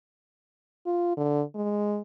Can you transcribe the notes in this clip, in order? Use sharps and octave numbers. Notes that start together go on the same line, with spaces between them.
F4
D3
G#3